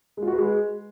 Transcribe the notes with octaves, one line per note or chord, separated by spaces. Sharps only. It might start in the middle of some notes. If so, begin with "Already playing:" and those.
G#3
F4
F#4
B4
G#3